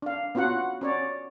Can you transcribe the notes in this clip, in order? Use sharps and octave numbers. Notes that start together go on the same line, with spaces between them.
D4 F5
B3 C#4 F4 F#4 F#5
C#4 C#5 D5